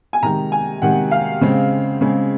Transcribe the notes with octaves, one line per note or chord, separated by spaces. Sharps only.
G#5
C3 D#3 G#3 A#5
G#5
C3 D#3 G#3 F#5
F5
C#3 G#3 C4
C#3 G#3 C4